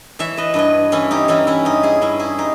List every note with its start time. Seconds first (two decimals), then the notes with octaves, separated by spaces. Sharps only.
0.19 E3 C#5 E5
0.37 B4 D#5
0.54 G2 B4 D#5
0.92 E3 C#4 E4
1.11 D#4 G4
1.28 E3 C#4 E4
1.47 C#4 E4
1.65 G2 D#4 G4
1.83 E4 G#4
2.01 G2 C#4 E4
2.19 E4 G#4
2.38 D#4 G4